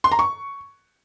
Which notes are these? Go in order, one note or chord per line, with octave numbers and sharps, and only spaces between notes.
C6
A#5
C#6